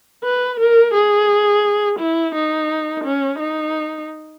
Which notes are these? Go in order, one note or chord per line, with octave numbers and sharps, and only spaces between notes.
B4
A#4
G#4
E4
D#4
C#4
D#4